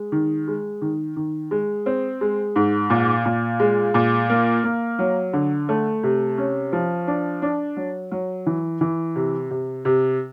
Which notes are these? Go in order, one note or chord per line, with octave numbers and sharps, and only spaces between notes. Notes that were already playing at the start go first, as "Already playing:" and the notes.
Already playing: G#3
D#3
G#3
D#3
D#3
G#3
C4
G#3
G#2
A#2
A#2
G#3
A#2
A#3
A#3
F#3
D3
A3
C3
C#4
F3
D4
D4
F#3
F#3
E3
E3
C3
C3
C3